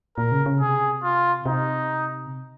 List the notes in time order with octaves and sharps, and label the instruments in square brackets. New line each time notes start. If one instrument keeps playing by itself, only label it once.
[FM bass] A#2 [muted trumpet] A#4
[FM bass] C#3
C#3
[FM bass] C3 [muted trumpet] G#4
[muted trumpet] F4
[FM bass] C3 [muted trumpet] D#4